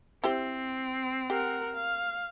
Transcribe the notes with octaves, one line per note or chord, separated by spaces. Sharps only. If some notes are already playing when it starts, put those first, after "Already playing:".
C4 E4 G4 C5
G4 A#4 F#5
F5